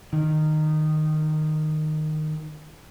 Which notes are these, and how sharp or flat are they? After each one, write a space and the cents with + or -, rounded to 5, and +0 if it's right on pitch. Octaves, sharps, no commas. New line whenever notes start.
D#3 -10